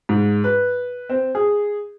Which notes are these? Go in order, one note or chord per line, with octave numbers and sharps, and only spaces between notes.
G#2
B4
C4
G#4